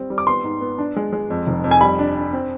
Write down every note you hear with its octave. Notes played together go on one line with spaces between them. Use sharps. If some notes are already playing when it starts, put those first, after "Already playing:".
Already playing: G3 C4
G3
D6
B3 C6
G#2
B3
D4
G#3
G#3
F2
F1
F2
G#5
G3 B5
D4
D4
C4